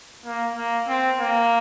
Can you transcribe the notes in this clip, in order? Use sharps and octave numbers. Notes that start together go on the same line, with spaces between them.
A#3
A#3
C4
A#3